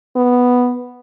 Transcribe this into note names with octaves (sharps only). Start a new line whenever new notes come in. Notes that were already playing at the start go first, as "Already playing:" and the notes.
B3